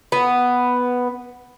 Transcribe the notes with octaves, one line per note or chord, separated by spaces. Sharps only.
B3